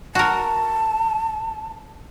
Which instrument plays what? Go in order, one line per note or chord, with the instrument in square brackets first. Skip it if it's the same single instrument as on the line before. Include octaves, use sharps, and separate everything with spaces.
[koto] F#4 A#4 [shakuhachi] A5